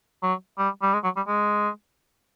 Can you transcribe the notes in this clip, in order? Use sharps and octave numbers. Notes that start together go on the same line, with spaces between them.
F#3
G3
G3
G#3
F#3
G3
G#3